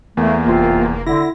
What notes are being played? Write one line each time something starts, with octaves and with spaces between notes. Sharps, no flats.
E2 A3 A#3
F1 C3 C4 F4
D3 E4 A#6